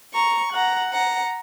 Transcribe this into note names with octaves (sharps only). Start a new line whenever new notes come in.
A#5 C#6
F#5 A#5
F#5 A#5